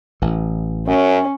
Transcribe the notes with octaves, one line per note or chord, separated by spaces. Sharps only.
A1 E3
F#2 C#4